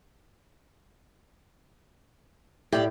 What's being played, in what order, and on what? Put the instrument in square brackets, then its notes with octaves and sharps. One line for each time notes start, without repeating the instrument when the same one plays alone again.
[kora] A2 [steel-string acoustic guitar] G4 D5 F5